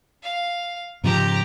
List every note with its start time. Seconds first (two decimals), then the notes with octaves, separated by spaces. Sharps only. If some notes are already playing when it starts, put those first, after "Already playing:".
0.22 F5
1.04 G#2 C#3 F3 G4 A#5